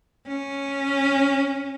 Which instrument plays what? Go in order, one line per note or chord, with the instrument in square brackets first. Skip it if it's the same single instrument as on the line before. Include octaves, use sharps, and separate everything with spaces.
[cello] C#4